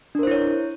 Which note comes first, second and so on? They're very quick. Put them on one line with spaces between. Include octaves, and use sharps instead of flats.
D4 A#4 C5 E4 C#5